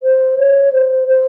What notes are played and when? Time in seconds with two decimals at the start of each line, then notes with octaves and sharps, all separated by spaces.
0.02 C5
0.38 C#5
0.72 C5
1.08 C5